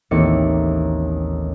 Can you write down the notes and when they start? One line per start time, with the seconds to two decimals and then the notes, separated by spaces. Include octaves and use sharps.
0.11 A1 D#2 C4 D#4 D6 C#7